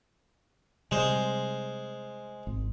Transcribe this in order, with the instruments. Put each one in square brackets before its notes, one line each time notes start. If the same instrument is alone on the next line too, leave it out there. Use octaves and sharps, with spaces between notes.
[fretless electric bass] C3 G3 [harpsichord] G#3 C5
[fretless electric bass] G#1